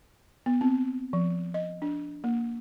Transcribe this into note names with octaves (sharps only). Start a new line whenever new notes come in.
B3
C4
F3
D#5
D4
A#3